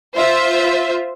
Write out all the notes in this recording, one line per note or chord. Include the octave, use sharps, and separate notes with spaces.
F4 C5 E5